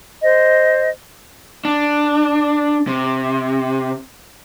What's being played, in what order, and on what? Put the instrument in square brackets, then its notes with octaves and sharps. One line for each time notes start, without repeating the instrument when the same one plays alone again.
[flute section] C5 D#5
[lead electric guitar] D4
C3